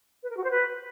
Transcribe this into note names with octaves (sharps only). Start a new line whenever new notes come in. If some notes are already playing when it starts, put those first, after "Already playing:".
B4
A#4
F#4
C5
B4